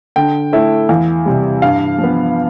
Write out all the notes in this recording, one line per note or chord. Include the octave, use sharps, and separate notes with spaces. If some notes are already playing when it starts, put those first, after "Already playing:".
D3 G5
A3 E4
E2 F5
C3 G3
G2 F5
F3
B3